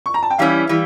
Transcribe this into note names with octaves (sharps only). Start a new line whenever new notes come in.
C#6
A#5
A5
G5
E3 G3 C#4 E4 F5
E3 G3